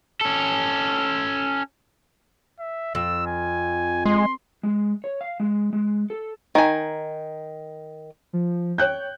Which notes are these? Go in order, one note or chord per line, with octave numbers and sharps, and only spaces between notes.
C#4 A4
E5
F2 E6
G#5
G#3 C6
G#3
C#5
F5
G#3
G#3
A4
D#3 G#5
F3
C#5 G5 F#6 G6